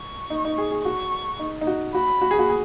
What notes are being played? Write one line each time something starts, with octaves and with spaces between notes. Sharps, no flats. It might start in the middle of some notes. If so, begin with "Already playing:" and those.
Already playing: C#6
D#4
D#4
G#4
G#4
F#4 C#6
D#4
D#4
F#4
F#4 B5
F#4
G#4
F#4
G#4